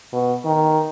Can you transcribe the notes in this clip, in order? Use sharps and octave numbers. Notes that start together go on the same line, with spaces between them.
B2
D#3